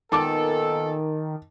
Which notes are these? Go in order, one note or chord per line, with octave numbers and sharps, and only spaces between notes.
A#2 D#3 B3 A4 A5 D6